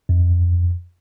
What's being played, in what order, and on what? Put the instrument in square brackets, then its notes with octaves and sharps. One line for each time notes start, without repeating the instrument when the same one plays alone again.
[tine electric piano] F2